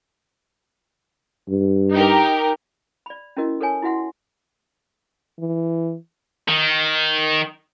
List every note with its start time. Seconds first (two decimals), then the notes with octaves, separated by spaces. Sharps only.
1.48 G2
1.93 D#4 G4 A#4
3.06 D5 B5
3.37 C#4 E4 F#4 A#4 D#5
3.61 A4 A#4 C#5 G#5 A5
3.82 E4 F#4 E5 F#5 C6
5.39 E3
6.48 D#3